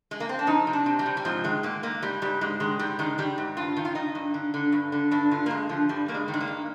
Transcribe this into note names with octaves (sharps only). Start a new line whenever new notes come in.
G#3
A#3
C4
D4
F2 D#4
C3
D4
C3
G3
C3
G3
G#2 F3
D#3 G#3
G#2 A#3
G#2 A#3
G#2 G3
G#2 G3
G#2 G#3
D#3 G#3
G#2 G3
D#3 G#3
D#3 G3
G#2
G2 F4
D#3
F4
D#3 D#4
G2
D3
D3
G2
D3
G2 D4
D3 F4
A#3
G2 G#3
D3 F3
G2 G3
G2 A#3
G#3
D#3
G#3
A#3
G2